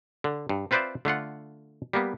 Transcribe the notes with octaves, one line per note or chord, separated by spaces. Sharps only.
D3
G2
C4 F4 B4 C5 D5 E5
D3 A3 F4 F#5
G3 A#3 B3